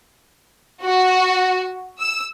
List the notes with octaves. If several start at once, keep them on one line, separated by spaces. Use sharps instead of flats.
F#4
E6